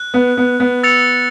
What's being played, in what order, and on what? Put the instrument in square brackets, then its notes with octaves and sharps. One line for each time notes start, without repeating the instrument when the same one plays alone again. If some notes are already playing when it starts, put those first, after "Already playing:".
Already playing: [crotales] F#6
[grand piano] B3
B3
B3
[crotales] E6 A6 C#7 F7